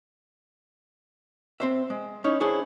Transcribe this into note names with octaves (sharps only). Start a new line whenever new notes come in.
C4 C5 E5
G#3
C#4 D#4 E4 C#5
D4 E4 G#4 C5 C#5